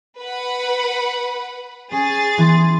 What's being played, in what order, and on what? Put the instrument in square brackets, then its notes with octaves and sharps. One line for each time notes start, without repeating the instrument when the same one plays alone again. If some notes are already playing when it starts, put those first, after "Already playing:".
[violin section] B4 F#5 B5
[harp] C#4 [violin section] G#4 A6
[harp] E3 B3 C6